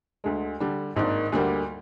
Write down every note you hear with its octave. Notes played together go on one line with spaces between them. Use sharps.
D2 D3 G#3
D3 G3 D4
G#1 G#2 D#3 A#3 D4
D2 D3 G3 A#3